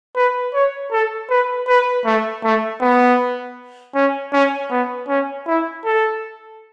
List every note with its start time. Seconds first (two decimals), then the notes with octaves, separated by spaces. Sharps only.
0.16 B4
0.54 C#5
0.92 A4
1.30 B4
1.68 B4
2.06 A3
2.44 A3
2.81 B3
3.95 C#4
4.33 C#4
4.71 B3
5.08 C#4
5.47 E4
5.85 A4